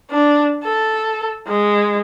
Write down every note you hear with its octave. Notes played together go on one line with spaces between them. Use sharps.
D4
A4
G#3